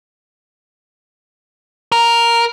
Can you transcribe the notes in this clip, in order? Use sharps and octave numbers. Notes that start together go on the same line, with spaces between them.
A#4